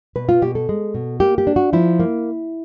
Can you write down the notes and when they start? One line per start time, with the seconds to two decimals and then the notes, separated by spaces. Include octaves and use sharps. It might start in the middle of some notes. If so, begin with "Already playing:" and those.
0.16 B2 B4
0.29 F4
0.42 B2 G4
0.55 A4
0.69 G#3
0.94 B2
1.20 A#3 G4
1.38 G4
1.47 D4
1.56 F#4
1.73 F3 E4
2.00 A#3